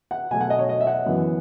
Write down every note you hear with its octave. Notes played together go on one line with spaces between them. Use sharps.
F#5
B2 F#3 A3 G#5
F#5
D#5
C#5
D#5
E5
F#5
F#2 E3 B3